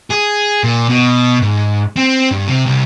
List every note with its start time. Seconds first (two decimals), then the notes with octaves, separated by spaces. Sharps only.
0.11 G#4
0.64 A#2
0.90 B2
1.42 G#2
1.97 C4
2.31 G2
2.48 C3
2.66 C2